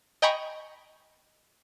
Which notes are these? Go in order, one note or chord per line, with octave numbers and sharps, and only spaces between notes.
D#5 G5 G#5 A#5 B5 C#6